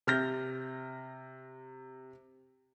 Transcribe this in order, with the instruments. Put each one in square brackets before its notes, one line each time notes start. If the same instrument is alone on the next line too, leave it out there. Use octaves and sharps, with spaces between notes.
[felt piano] C3 F6 G6 A#6